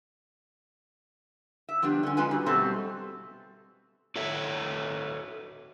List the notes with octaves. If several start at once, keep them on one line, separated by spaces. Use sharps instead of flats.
E5
F3 G3 B3 D4
D3 C#4
G#3 C#4 F4 B4 G#5
G3 F#4
B2 G3 A3 C4
F#4 A4 C#5 E5